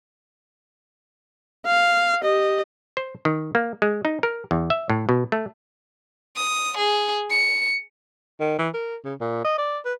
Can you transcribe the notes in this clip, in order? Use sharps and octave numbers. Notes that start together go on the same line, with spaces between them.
F5
G4 D#5
C5
D#3
A#3
G#3
D#4
A#4
E2
E5
A2
B2
A3
D#6
G#4
C#7
D#3
E3
A#4
C#3
A#2
D#5
D5
B4